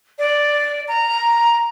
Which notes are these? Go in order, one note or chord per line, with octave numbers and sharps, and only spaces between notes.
D5
A#5